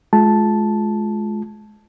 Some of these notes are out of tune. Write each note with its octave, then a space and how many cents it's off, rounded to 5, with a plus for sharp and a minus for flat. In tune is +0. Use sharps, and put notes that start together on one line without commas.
G#3 +30 F4 +0 A5 -5